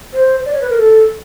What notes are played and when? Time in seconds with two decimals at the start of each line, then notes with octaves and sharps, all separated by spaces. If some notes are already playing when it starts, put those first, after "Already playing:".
0.14 C5
0.46 D5
0.53 C#5
0.61 B4
0.70 A#4
0.78 A4